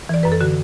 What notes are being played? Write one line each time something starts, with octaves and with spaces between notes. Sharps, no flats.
E3 D5
F#2 B4
A4
D3 F#4